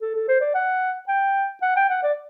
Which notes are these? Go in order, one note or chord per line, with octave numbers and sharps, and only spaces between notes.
A4
A4
C5
D5
F#5
G5
F#5
G5
F#5
D5